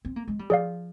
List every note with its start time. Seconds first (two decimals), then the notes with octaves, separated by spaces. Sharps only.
0.05 C4
0.16 A#3
0.28 G#3
0.39 G3
0.50 F3 G#4 D5 F5